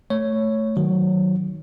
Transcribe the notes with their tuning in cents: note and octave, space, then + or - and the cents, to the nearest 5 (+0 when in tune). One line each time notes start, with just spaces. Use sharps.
A3 +0 C#5 +0
D#3 +0 F#3 +0